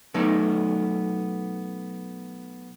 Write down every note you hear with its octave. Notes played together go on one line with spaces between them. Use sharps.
B2 F#3 A3 B3 D#4